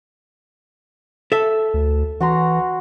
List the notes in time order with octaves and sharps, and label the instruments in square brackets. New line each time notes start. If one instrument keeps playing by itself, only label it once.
[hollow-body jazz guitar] A4 E5
[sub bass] D2
[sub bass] E3 [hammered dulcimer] F#4 A#5 C6